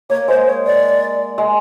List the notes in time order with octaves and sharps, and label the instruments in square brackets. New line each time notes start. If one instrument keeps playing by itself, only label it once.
[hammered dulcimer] A#3 [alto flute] C#5
[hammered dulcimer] G#3 [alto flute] C5
[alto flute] C#5
D5
[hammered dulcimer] G#3